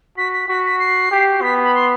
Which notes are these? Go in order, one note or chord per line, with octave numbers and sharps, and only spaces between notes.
F#4 B6
B6
F#4 B6
B6
C7
G4
B3 B6
B5
C6